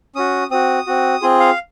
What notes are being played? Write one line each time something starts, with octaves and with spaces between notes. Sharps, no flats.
C#4 F#4 D#6
C4 F#4 D#6
C4 F#4
C4 F4 G#4
F5